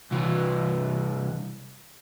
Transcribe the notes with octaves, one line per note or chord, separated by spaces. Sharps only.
C2 E3